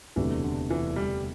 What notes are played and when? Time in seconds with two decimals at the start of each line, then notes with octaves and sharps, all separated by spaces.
0.16 E1 D2 C3 E3 A3 D4
0.43 D3
0.70 E3
0.96 G3